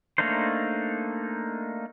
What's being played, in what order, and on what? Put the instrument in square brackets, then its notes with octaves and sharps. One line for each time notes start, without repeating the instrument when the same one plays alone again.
[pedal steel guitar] A3 A#3 D4 D#4 C5